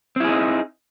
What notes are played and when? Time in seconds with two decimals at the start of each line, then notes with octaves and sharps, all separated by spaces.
0.16 C4
0.20 E4
0.24 G#4
0.29 D#4